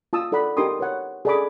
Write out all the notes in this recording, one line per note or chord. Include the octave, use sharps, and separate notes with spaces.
F4 A5 D#6 E6
D#4 A4 D5 F#5 B5
D#4 G4 A#4 C6 D6 D#6
B4 C#5 F#5
G#4 A4 D5 A5 B5 D6